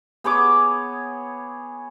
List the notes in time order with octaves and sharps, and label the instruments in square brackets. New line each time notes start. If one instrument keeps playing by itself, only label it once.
[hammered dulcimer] B3 G#4 C#5 D6